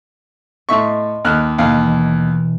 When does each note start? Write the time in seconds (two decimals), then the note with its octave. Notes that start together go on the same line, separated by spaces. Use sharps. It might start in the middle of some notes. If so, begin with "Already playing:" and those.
0.69 A2 D#5 E5 A5 C6 C#6
1.25 D#2 F6 F#6
1.58 D#2 B2 E3 F5